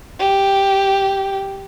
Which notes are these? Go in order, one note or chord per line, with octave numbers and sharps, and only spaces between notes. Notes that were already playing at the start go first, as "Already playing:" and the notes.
G4